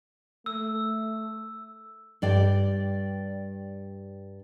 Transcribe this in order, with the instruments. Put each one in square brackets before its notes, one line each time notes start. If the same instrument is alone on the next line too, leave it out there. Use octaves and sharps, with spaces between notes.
[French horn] A3 [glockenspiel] E6
[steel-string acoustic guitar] G2 D5 G5